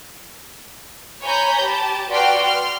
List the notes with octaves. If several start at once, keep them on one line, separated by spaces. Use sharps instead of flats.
C#5 G#5 A#5 B5 G6
G4 A5
F#4 B4 D5 G5 C6 F6
C6 F6